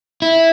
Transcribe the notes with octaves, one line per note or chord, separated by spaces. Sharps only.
E4